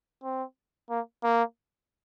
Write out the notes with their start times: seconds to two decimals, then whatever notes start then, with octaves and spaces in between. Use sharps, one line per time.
0.23 C4
0.90 A#3
1.23 A#3